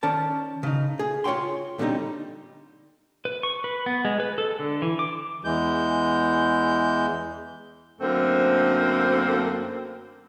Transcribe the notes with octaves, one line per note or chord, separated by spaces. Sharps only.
D#3 C#4 D5 A5
C#3 D#4
G#4
F4 C#5 D5 G5 C6
D#2 A2 D3 G3 C4 D#4
B4
C#6
B4
B3
G#3
B4
A4
D3
E3
D6
E2 E3 G#3 G6
F#2 D3 A3 A#3 C4 C5